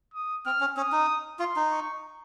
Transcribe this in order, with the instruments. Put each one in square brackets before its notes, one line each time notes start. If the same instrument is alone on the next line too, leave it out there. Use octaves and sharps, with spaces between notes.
[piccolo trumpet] D#6
[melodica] C4 [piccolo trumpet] F6
[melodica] C#4
[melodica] C#4 [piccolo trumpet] D#6
[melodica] D#4
[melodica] F4 [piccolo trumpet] C6
[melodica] D#4
[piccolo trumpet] C#6